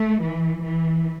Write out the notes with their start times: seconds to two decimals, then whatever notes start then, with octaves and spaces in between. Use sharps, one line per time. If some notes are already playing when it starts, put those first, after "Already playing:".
Already playing: A3
0.23 E3
0.64 E3